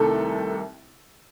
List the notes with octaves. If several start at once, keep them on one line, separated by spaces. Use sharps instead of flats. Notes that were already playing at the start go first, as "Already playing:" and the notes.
Already playing: C2 C3 D#3 A3 A4